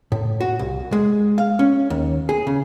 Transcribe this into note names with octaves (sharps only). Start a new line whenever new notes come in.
A2
F#4
C2
G#3
F5
C#4
D#2
G#4
C#3